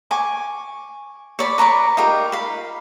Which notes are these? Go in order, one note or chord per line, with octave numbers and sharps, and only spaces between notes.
G#5 C#6 D6
C#5 D5 B5
B4 A#5 C#6 D6
D#4 F4 G4 A#4
F5 B5